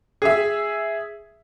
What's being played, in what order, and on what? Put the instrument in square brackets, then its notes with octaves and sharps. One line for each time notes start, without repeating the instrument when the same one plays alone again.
[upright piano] G#4 E5